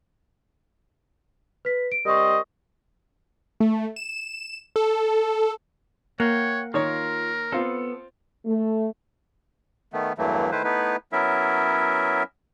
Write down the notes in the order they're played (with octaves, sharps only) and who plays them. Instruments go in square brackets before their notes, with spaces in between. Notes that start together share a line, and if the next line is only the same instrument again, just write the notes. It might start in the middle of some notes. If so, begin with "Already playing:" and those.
[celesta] B4 B6
D7
[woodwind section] G3 C4 D#5 [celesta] A#4 C#6
[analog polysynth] A3
E7
A4
[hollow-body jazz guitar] A#3 [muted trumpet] C#5 [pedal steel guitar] F#5 G5
[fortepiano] D#3 C#5 [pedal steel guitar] F4 [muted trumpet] A#4
[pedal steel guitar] B3 A4 [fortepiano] C4 F4
[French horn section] A3
[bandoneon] D#3 A3 B3
E2 G2 E3 F#3 A3 A#3
D#3 A3 E4 B4 C5
A3 B3 D#4 E4 B4
F#3 B3 C#4 E4 A#4 E5